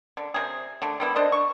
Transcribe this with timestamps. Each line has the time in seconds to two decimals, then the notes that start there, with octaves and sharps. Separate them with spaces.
0.17 D3
0.34 C3 G#4
0.82 D3 A3
1.00 G3 B3 E4
1.16 D4 C5 D#5
1.32 C#6